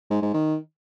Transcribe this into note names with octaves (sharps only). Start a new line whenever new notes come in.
G#2
G#2
D#3